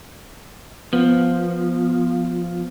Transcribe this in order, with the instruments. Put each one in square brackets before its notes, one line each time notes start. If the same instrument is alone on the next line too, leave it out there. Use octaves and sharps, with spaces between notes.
[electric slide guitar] F3 [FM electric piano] B3